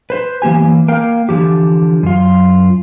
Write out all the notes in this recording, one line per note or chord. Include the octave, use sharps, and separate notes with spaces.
B4 C5
E3 A#3 G4 G#5
E3 A#3
A#3 A#4 F5 G5
D3 E3 F3 G4
F#2 F4